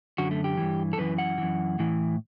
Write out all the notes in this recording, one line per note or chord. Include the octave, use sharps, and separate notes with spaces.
F#2 D3 F#4
A3
G4
G2 E3
A4
F#2 E3 B4
F#5
F#2 E3
A2 E3